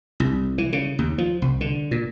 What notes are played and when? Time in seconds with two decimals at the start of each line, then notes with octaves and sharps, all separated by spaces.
0.20 C2
0.58 E3
0.73 C#3
0.99 D#2
1.18 F3
1.42 C2
1.61 D3
1.91 A#2